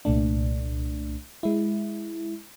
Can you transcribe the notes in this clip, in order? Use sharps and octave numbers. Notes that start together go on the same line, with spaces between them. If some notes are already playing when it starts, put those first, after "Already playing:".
C2 A#2 A3 D4
G#3 E4